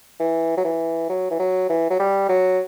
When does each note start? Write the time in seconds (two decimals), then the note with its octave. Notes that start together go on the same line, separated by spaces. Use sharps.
0.20 E3
0.57 F#3
0.65 E3
1.09 F#3
1.31 E3
1.39 F#3
1.69 E3
1.90 F#3
1.99 G3
2.29 F#3